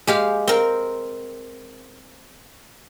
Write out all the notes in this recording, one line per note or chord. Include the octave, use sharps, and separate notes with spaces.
G#3 G4 F5
C4 A#4